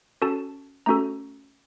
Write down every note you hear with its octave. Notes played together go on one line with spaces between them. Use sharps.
C#4 F#4 A4 A5
A3 C#4 F#4 A4 A#5